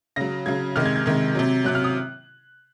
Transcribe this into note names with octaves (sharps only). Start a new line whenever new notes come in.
C#3 F#3 A#6
C#3 F#3 G#6
C3 D#3 G#3 F6
G#6
G#6
C3 D#3 G#3
C3 F#3
C3 F#3 F#6
F6
D#6